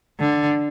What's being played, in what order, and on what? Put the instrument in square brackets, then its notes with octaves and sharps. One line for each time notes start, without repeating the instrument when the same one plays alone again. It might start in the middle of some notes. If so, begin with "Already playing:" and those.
[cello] D3